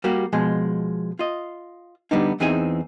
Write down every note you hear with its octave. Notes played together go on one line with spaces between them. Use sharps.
G3 A#3 F#4 G4
B2 F3 G#3
F4 D#5
D3 G3 B3 D4 D#4
E2 E3 C4 D#4 G#4 G#5